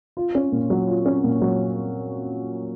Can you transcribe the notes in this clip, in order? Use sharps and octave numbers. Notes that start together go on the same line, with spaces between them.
F4
C#4
A#2
F#3
F4
C#4
A#2
F#3